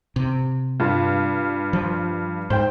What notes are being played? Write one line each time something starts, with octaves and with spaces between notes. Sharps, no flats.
C3
G2 F4
F3
G#2 C5 G5